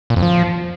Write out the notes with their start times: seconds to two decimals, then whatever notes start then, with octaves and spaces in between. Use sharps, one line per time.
0.10 A#2
0.16 F2
0.23 F3